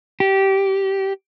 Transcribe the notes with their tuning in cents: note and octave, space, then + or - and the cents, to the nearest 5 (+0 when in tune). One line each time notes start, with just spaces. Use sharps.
G4 -15